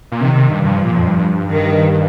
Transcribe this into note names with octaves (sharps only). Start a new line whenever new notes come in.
A#2
C3 D#3
C3
G2
G2 F3
A#2
F2
G2
D#3